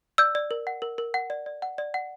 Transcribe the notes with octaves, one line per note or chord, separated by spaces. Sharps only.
D5 E6 G6
D5
A#4
F#5
A#4
A#4
F#5
D5
D5
F#5
D5
F#5